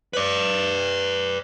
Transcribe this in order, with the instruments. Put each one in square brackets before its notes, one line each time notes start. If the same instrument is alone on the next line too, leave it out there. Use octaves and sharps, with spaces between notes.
[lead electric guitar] B4 D5